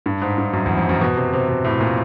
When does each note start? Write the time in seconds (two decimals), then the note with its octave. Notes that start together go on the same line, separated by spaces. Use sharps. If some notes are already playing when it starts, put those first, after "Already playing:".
0.06 G2
0.22 G#2
0.38 G2
0.53 F#2
0.66 E2
0.78 F2
0.89 F#2
1.01 B2
1.17 C3
1.33 C3
1.48 B2
1.64 A2
1.81 A#2